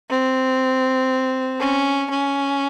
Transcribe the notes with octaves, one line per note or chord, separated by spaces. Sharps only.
C4
C#4
C#4